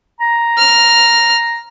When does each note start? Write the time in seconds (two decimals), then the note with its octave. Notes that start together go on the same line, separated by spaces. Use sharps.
0.20 A#5
0.58 F6